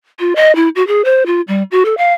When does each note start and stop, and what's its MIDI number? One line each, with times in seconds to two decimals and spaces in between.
0.19 0.34 65
0.36 0.55 75
0.56 0.69 64
0.76 0.85 66
0.87 1.02 68
1.05 1.26 72
1.26 1.41 65
1.48 1.63 55
1.71 1.83 66
1.85 1.94 69
1.98 2.13 77